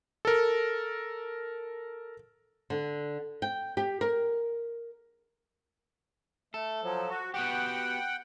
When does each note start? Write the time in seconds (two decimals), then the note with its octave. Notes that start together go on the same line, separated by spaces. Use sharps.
0.25 A4 A#4
2.70 D3
3.42 G5
3.77 G4
4.01 A#4
6.54 A3 A4
6.83 F3 F#3
7.10 F#4
7.34 B3 F#4 G4 F#5 G5